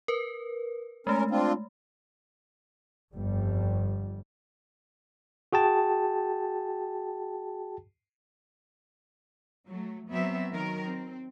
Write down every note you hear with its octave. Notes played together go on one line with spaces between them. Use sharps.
A#4 B4
G#3 A3 C#4 A#4
C4 D4 F4
G1 F2 G3
F#4 G#4 G5 A5
F#3 A3
F#3 B3 C4 E5
D#3 F#3 A#4
C4